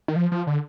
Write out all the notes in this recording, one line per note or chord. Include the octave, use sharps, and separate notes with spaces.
D#3
F3
F3
D3